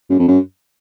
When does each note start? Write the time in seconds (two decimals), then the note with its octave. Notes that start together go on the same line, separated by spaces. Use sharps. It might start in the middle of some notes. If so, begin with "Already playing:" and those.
0.10 F#2
0.19 F2
0.28 F#2